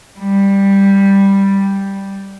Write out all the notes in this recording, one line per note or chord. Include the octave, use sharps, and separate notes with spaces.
G3